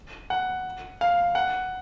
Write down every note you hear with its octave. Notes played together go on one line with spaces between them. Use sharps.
F#5
F5
F#5